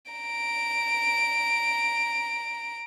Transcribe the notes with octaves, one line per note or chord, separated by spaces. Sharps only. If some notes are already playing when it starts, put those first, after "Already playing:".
A#5 D7